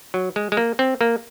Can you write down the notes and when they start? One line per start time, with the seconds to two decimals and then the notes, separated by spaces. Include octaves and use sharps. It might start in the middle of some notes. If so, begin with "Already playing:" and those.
0.14 F#3
0.36 G#3
0.52 G#3
0.57 A#3
0.79 C4
1.01 A#3